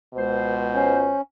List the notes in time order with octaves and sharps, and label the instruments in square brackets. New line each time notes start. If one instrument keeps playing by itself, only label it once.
[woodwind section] C#2 C5 [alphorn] B2
[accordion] C#4